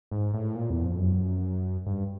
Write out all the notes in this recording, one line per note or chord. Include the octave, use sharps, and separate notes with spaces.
G#2
A2
A#2
E2
F2
F#2
G2